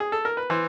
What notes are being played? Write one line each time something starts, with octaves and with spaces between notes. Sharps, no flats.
G#4
A4
A#4
B4
E3 C5